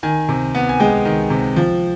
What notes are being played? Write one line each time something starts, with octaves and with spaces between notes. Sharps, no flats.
D#3 G#5
C3
B3
G#5
G#3 G5
D#3
C3
F3